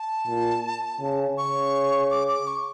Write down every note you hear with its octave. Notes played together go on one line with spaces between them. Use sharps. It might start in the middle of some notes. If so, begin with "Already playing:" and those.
Already playing: A5
A#2
C#3
C#3 C#6
D6
D6
C#6